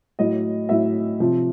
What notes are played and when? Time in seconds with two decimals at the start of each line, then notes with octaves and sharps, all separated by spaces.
0.19 A2 F#3 D#5
0.69 A2 F#3 E5
1.20 C3 F3